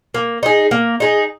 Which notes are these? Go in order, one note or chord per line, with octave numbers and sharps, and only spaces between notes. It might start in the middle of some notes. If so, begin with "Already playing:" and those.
A#3
D#4 G#4
A#3
D#4 G#4